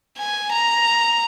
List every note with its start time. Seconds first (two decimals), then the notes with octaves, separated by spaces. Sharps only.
0.18 G#5
0.52 A#5